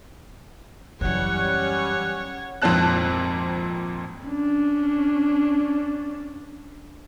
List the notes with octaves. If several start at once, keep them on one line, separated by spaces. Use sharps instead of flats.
F#2 E3 G3 C#4 C#5 F#5 F#6
G#1 F2 A#2 C4 A5 F#6
C#4 D4